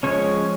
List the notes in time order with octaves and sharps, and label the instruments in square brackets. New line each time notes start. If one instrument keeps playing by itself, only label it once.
[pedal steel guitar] F3 G#3 C#4 C#5